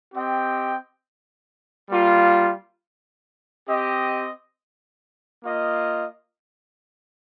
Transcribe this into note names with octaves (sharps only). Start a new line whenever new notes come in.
C4 G4 D#5 G5
G3 A#3 F4
C4 G4 D#5
A#3 F4 D#5